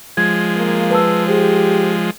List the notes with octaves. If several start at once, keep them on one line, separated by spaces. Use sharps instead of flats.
F3 G#3 G#6
A#3
B4 A5 E6
G4 G#4 C5